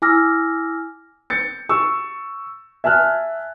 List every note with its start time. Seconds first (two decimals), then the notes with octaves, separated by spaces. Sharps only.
0.02 E4 G#5 D6 E6 F6 A#6
1.30 G6 A6 C#7
1.69 C#6 E6
2.84 E5 G#5 A5 F6 F#6